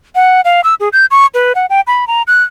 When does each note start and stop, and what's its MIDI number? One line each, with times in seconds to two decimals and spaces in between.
0.15 0.41 78
0.45 0.61 77
0.64 0.75 88
0.80 0.89 68
0.93 1.06 91
1.11 1.26 85
1.34 1.53 71
1.55 1.66 78
1.70 1.81 79
1.87 2.07 83
2.07 2.22 82
2.27 2.43 90